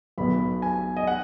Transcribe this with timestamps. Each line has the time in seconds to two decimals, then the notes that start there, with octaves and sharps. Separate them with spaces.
0.18 B1 B2 B3 B5
0.62 G#5
0.97 D#5
1.07 F#5